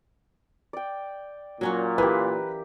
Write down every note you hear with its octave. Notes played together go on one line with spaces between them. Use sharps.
D5 G5
A#2 F#3 C#4 F#4
E3 G4 A#4 B4 F5